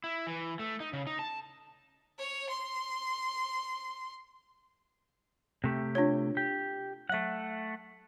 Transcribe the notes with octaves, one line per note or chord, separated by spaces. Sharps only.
E4
E3
A3
D#4
C#3
D#4
A5
C#5
C6
C3 A3 G4
D4 F4 C#5
G4
F#3 A3 E5 F#5